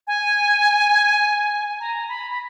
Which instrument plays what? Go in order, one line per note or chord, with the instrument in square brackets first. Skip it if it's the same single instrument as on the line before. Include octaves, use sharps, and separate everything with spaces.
[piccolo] G#5
A#5
B5
B5